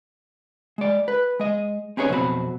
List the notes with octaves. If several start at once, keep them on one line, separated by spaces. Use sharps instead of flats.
G#3 D5
B4
G#3 D#5
C4 C#4 D#4 G#4 B4 C#5
F2 B2 F#3 C4 B5